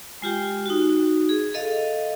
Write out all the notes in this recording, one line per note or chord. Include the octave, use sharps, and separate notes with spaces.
G#3 F4 G4 G5
D#4 F#4
G#4
A4 D#5 F5